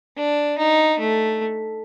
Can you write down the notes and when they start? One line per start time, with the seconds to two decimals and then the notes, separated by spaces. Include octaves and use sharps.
0.17 D4
0.58 D#4
0.99 A3